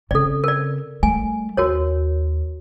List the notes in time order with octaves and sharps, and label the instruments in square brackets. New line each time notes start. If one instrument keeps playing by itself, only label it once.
[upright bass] C#3 C4 [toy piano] A4 D5
[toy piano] A#4 D5
[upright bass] G3 A3 [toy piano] G#5
[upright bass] D#2 [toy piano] F#4 A#4 C#5